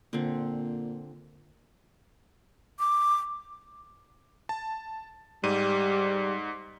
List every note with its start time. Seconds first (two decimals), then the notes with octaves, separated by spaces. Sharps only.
0.13 A#2 D3 C4
2.79 D6
4.49 A5
5.44 G#2 G3 D#7